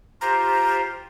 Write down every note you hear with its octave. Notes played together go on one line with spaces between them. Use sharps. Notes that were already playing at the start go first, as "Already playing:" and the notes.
F4 G4 C5 A#5